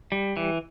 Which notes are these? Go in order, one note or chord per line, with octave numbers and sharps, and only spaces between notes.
G3
E3